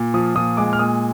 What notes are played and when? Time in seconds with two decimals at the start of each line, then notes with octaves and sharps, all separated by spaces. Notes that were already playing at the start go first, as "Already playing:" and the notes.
Already playing: A#2
0.14 F3 D#6
0.35 A#2 D#6
0.57 G#3 D6
0.73 F6
0.79 A#2 D#6